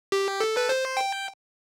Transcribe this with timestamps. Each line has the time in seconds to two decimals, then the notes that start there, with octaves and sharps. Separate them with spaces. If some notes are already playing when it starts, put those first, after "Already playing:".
0.12 G4
0.40 A4
0.57 B4
0.69 C5
0.97 G5